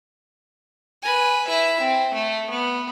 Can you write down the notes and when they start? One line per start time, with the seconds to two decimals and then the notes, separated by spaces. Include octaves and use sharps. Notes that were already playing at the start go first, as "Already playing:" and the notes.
1.03 B4 G#5
1.47 E4 E5
1.80 C4
2.14 A3
2.50 B3